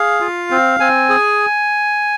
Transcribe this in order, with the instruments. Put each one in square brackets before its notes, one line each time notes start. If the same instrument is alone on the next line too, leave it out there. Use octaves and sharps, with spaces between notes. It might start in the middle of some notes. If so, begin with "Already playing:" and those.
Already playing: [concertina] G#4 F5
F4
C4
C4 G#5
G#4